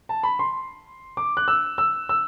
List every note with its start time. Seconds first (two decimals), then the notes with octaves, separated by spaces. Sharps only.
0.09 A5
0.23 B5
0.39 C6
1.17 D6
1.37 F#6
1.48 E6
1.78 E6
2.09 E6